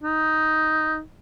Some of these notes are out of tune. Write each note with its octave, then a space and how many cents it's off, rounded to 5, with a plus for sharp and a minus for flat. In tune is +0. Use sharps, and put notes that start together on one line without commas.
D#4 +5